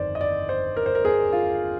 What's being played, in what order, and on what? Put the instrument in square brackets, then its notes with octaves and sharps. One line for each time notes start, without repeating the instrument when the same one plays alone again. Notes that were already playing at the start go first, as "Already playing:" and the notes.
Already playing: [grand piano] G1 F2 D#3 C5 D5
D#5
D5
C5
A#4
C5
A#4
G#4
F4